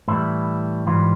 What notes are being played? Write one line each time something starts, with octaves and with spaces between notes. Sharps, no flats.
A2 E3 G3 E4
G#2 E3 G3 F4